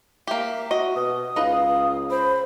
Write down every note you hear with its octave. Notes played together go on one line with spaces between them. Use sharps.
A#3 G4 E5
F#4 D#5
B2 D#6
C#2 D#4 B4 F5
C5 B5